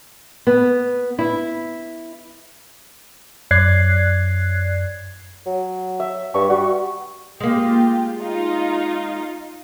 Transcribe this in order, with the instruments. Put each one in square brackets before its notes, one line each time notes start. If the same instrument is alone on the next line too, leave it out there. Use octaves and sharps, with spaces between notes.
[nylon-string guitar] B3
E4
[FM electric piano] F#2 D5 F#6 G#6 C7
[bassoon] F#3
[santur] E5
[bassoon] G2 [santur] C#6
[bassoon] G3 [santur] F#4
[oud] G#3 A#3 [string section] F4 G4
[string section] D#4 F4